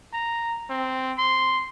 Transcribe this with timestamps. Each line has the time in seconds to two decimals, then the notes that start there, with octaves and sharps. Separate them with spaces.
0.13 A#5
0.70 C4
1.18 C6